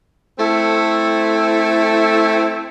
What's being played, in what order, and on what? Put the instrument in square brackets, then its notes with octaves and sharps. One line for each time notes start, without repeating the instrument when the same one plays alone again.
[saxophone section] A3 C4 E4 A4